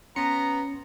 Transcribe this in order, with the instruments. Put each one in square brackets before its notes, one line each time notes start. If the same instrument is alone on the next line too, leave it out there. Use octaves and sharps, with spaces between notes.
[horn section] B3 A#5 [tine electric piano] C#4 C6 C#7